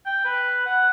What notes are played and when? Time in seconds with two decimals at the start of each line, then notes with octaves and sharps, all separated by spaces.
0.06 G5
0.25 B4
0.66 F#5